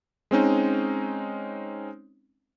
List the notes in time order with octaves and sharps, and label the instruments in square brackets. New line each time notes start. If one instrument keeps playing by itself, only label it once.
[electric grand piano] G#3 C4 C#4 D#4